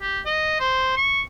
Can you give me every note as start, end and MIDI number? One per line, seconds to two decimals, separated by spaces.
0.02 0.20 67
0.26 0.56 75
0.60 0.95 72
0.97 1.22 85